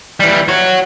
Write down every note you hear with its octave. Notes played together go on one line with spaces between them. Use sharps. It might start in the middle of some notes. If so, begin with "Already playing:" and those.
E3 G3
F#4 C#5